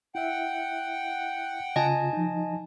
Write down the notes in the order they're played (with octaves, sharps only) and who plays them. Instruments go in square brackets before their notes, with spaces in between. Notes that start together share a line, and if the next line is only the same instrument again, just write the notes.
[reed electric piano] E4 E5 [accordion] F#5 G5
[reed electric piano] C#3 F4 [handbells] D#5 G#5 A5
[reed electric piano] F3 D#4